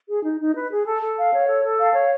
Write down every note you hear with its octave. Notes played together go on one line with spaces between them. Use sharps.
G#4
D#4
D#4
B4
G#4
A4
A4
F5
C#5
A4
A4
F5
C#5